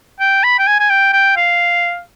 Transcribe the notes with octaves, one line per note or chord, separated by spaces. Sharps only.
G5
B5
G5
G#5
G#5
G5
G5
F5